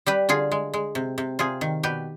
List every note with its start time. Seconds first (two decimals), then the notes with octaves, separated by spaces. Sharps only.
0.06 G3 G4 B4
0.29 D3 F4 G#4
0.52 G#3
0.74 G#3
0.95 C3
1.18 C3
1.39 C3 F4 G#4
1.61 D#3
1.83 B2 G4 B4